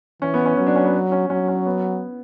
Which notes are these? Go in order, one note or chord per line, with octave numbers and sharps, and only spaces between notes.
E3 C#4
B3
C#4
F#3 C#4
D4
C#4
B3
C#4
F#3 C#4
C#4
B3